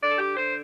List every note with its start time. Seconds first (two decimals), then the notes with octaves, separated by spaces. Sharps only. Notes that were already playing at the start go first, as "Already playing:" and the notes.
0.01 D3 D5
0.11 A4
0.19 G4
0.36 D3 C5